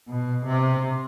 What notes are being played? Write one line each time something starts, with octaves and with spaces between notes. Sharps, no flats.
B2
C3